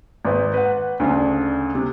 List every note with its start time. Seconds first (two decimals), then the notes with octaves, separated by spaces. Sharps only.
0.25 G#1 B4
0.54 B4 F#5
1.00 D2 C#3 D4
1.75 C3